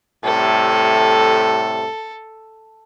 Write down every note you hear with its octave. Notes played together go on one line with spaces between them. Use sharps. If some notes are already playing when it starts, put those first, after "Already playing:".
A2 C3 G3 A4